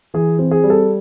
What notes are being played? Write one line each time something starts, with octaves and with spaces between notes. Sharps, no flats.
E3 G#4
C4
G#4
G3
A4